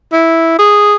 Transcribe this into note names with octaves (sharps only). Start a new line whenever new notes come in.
E4
G#4